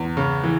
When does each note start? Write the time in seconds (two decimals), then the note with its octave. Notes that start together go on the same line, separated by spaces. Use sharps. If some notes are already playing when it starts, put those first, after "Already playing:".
Already playing: E2
0.17 C#3
0.44 E3